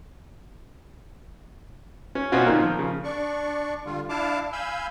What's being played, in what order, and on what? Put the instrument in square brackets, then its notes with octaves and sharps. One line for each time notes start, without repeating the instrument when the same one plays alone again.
[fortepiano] C#4
B2 C4 C#4 F4 F#4
A#2 D#3 A#3
F3
C#3
[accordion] D4 D5 C#6
D3 G3 F4
D4 E4 F5 A5 D6
F5 G#5 B5 E6 G6